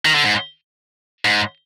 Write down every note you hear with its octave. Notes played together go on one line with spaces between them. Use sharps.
D#3
D3
G#2
G#2